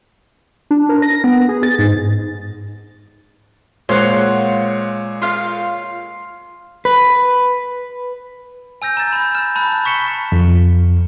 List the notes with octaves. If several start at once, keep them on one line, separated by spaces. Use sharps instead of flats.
D4
A#4
A#6
B3
G#4
A6
G#2
A#2 G#3 C5 C#5 F5 F#5
F4 F5
B4
G#5 E6 G6 A#6
A#5 A6
A#5 B5
F6 E7
A5 B5 F#6 E7
C#6 B6 C#7 E7 G7
F2